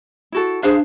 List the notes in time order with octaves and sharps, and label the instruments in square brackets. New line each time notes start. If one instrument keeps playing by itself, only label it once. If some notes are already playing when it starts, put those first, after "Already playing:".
[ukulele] E4 F#4 A4
[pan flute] D4 [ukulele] G#4 C5 F5